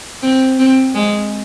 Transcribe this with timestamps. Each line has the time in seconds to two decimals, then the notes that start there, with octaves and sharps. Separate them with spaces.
0.22 C4
0.59 C4
0.95 G#3